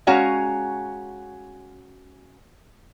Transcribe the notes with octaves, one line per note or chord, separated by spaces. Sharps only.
G#3 C#4 F#4 F5 G#5 A#5